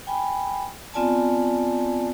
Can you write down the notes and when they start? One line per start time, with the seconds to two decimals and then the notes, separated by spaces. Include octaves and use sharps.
0.07 G5 G#5 B5
0.94 B3 C4 F4 D5 G#5 A5